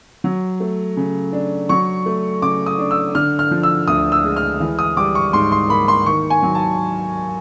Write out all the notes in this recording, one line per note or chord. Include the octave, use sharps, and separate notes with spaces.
F#3
A3
C#3
D4
F#3 C#6
A3
C#3 D6
D#6
D4
E6
D3 F6
F6
F3
E6
D2 D#6
E6
G#3
F6
E3
D#6
G3 D6
C#6
G#2 C6
C6
A#3 B5
C6
D#3 C#6
G#5
F#3
A5